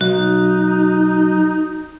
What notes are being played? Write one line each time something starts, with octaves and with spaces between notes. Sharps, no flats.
B1 D#4 F#4